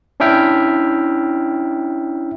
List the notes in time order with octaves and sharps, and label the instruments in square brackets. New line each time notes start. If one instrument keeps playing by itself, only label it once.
[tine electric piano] C#4 D4 E4 E5 G5 F6